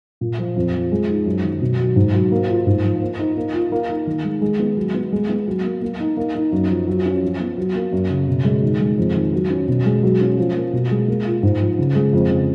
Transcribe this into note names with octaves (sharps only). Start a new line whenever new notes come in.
A#2
F3
F2
F3
G#3
D#4
F#2
D#3
B2
F#3
G#2
F#3
A#3
F4
G#2
F3
A#3
D#4
A#3
F4
A#3
D#4
D#3
G#3
G#3
B3
F#3
B3
G#3
B3
F#3
A#3
A#3
D#4
A#3
D#4
F#2
F3
F#3
C#4
F3
B3
F#3
A#3
F#2
C#3
B2
G#3
D#3
G#3
F2
D#3
F#3
C#4
B2
G#3
F#3
C#4
F3
A#3
B2
G#3
A#3
F4
G#2
F3
C#3
G#3
F2
C#3